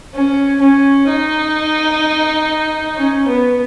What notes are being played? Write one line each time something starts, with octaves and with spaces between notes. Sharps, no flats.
C#4
C#4
D#4
C#4
B3